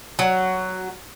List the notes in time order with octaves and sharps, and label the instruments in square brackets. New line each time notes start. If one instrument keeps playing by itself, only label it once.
[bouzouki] F#3